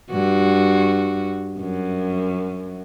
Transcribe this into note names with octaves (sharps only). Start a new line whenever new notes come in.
G2 F#4
F#2